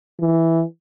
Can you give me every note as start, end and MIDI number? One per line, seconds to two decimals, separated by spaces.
0.20 0.63 52